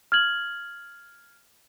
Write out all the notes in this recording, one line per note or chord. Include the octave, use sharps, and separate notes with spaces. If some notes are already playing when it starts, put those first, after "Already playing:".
F6 G#6 F#7